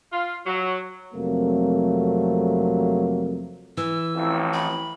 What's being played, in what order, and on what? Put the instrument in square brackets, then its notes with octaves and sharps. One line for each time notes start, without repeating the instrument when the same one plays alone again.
[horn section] F4
F#3
[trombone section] F2 C3 F#3 A3 A#3
[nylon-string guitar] E3 [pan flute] E6
[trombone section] A1 F2 A2
[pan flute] B5